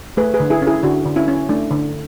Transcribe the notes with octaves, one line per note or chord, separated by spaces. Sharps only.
A3 G#4 B4
G#4 B4
D3
E4 G#4
C#4
E4 G#4
D3 D4 F#4
D3
C#4 E4
C#4
A3 D4
D3